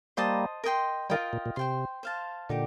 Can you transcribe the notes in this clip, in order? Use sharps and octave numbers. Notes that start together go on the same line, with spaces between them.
G3 A#3 C5 D#5 A5 D#6
A#4 D#5 G5 C6
D#3 G3 F4 A#4 D#5 G5
A#2
A#2
C3 C5 G5 C6
C5 F5 A5
A#2 D3 D#4 G4